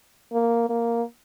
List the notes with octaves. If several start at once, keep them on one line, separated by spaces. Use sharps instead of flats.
A#3
A#3